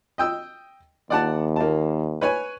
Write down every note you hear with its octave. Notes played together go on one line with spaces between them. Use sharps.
D#5 G5 E6
D#2 D5 F#5 A5
A#3 A5
B4 C#5 G#5